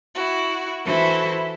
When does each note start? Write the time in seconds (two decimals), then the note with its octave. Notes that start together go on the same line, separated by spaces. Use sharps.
0.15 E4 F#4
0.85 E3 E4 F#4 A4 C5